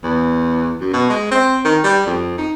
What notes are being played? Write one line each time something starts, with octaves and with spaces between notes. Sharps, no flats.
E2
F#2
B2
G#3
C4
D#3
G3
F2
D#4